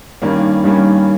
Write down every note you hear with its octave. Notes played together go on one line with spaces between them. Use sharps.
G2 D#3 G3 A#3 C#4
G2 D#3 G3 A#3 C#4